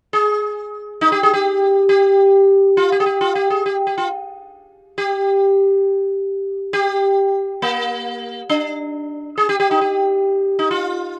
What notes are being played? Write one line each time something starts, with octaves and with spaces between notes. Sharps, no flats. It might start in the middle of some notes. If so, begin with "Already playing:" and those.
G#4
D#4
G4
G#4
G4
G4
F4
G4
G#4
G4
F4
G4
G#4
G4
G4
F4
G4
G4
A#3
D4
G#4
G4
G4
D#4
G4
D#4
F4